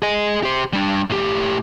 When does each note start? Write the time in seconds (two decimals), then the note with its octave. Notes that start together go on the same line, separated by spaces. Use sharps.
0.02 G#4 D#5
0.43 G4 C5
0.73 G3 D4
1.10 A2 G4